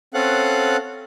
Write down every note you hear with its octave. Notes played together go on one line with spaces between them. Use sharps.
C4 C#4 A4 F5 F#5 F#6